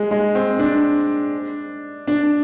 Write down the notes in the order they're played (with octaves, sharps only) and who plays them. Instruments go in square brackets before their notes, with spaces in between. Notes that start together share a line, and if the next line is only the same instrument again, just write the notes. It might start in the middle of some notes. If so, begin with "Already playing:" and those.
Already playing: [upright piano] G#3
G#3
C4
D4
D4